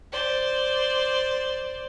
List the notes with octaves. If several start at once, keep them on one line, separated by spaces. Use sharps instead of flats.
C5 D5